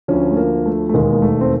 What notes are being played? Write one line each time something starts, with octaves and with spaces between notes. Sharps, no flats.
D2 D3 F3 C#4
A3
A#3
A3
A3
E1 D#2 D#3 G#3
A#3
A3
C4